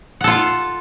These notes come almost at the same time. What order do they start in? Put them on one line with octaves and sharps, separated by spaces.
F#5 A4 F4 F5